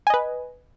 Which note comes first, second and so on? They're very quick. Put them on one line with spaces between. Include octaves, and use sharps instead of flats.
G#5 D#5 B4